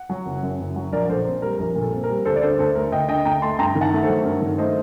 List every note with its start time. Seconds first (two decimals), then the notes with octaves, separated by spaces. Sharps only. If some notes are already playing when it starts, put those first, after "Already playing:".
Already playing: F#5
0.09 F#3
0.26 F#1
0.43 F#2
0.60 F#1
0.76 F#3
0.92 A#1 A#4 D5
1.09 A#2 A4 C5
1.26 C4
1.42 G3 A#4
1.59 A#1 A#4
1.76 A#2
1.82 A4
1.92 C4
2.03 A#4
2.09 G3
2.25 D2 A4 C5
2.36 D5
2.42 D3 A4 C5
2.59 D2 A4 C5
2.75 A3 A#4
2.92 D2 D#5 G5
3.09 D3 D#5 G5
3.25 D2 G5 A#5
3.42 A3 A5 C6
3.59 G2 G5 A#5
3.75 D#3
3.81 F#5 A5
3.92 A3
4.03 F#3 A4 C5
4.25 G2 A#4
4.42 D#3
4.58 A3 C5 D#5